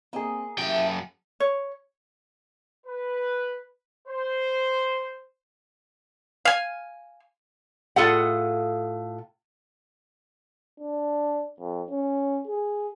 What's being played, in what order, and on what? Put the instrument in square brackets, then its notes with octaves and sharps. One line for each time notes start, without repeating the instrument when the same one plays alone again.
[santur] A#3 G#4 [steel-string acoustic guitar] C4 D#5
[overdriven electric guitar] F#2 G5 [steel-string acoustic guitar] E4 G4
[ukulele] C#5
[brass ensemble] B4
C5
[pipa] F5 G#5
[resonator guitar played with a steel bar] A2 F4 G#4 A4 F5 F#5
[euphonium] D4
F2
C#4
G#4